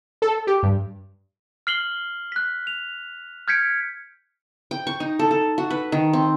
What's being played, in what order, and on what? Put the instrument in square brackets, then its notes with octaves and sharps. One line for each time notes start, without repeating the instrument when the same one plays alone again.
[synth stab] A4
G4
G2
[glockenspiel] F6 C7 F#7 G7
F#6 B6
F7
F6 G6 G#6 B6 C#7 D7
[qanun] G5
C#6
D#4
A4
A4
F#4
B4
D#3
C4